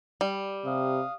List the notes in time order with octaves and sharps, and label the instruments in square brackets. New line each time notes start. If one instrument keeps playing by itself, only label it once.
[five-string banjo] G3
[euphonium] C3 [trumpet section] F5 D#6